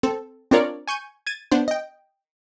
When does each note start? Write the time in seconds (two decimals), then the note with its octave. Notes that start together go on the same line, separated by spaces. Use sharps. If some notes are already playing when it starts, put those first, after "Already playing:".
0.03 C4 A4
0.51 C4 D4 F4 A#4 C#5 D5
0.88 G#5 C#6 G6 D#7
1.27 G#6 A6 D#7
1.51 B3 D4 C5
1.68 D#5 G5